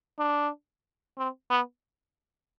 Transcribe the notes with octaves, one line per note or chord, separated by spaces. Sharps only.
D4
C4
B3